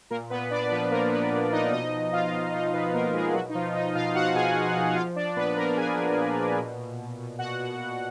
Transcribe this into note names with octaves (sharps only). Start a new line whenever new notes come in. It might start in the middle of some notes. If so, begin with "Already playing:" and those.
A#2 A#3 A#4
A#2 B3 B4
A#2 D4 D5
F3 B3 B4
F3 A#3 A#4
F3 B3 B4
A#2
F3 D#4 D#5
B2 D#4 D#5
B2
B2 F4 F5
B2
B2 D#4 D#5
B2 B3 B4
B2 A#3 A#4
B2 G#3 G#4
B2 F#3 F#4
D#4
B2 F3 F4
B2 D#4 D#5
B2 F4 F5
B2 F#4 F#5
B2 G#4 G#5
B2
B2
F3 F4 F5
F3 D4 D5
A#2 B3 B4
F3 A#3 A#4
A#2 G#4 G#5
F3
A#2
A#2
B2
B2
B2
B2
B2 F#4 F#5
B2
B2